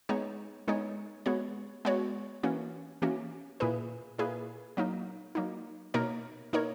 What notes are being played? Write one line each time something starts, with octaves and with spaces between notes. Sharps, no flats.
G#3 B3 D#4 G#4 C#5
G#3 B3 D#4 G#4 C#5
G#3 B3 F#4 C#5
G#3 B3 F#4 C#5
E3 A#3 C#4 F#4
E3 A#3 C#4 F#4
A#2 A#3 E4 G#4 B4
A#2 A#3 E4 G#4 B4
F#3 A#3 D#4
F#3 A#3 D#4
B2 A#3 D#4 A#4 C#5
B2 A#3 D#4 A#4 C#5